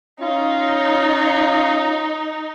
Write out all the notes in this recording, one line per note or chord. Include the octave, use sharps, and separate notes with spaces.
C#4 D#4 F4